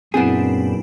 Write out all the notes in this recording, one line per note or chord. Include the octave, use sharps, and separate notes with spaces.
F#2 A#2 B3 C4 D4 E4 G#4